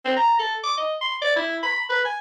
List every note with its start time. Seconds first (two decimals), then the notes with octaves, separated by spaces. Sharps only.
0.05 C4
0.16 A#5
0.39 A4
0.63 D6
0.77 D#5
1.01 C6
1.21 D5
1.36 E4
1.63 B5
1.89 B4
2.05 G#5